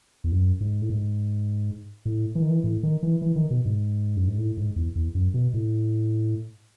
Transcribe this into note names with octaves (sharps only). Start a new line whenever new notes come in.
E2
F#2
G#2
A2
G#2
A2
E3
D#3
E3
A2
D#3
E3
E3
D#3
B2
G#2
F#2
G#2
A2
G#2
E2
E2
F#2
B2
A2